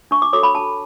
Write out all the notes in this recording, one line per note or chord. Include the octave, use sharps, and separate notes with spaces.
D4 C#6
D6
F#4 A4 C#5 D6
B5
D4 A5